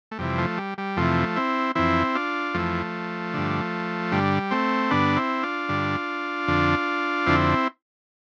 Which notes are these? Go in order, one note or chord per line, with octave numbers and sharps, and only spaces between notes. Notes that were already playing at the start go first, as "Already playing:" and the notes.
A3
F2 C3 E3 G3
F3 A3
G3
G3
F2 C3 E3 F3 A3
C4 E4
F2 E3 C4 E4
D4 F4
F2 E3 F3 A3
G2 D3
G2 D3 G3
A3 C4
G2 D3 B3 D4
C4 E4
D4 F4
G2 D3
F2 D3
F2 D3 C4 E4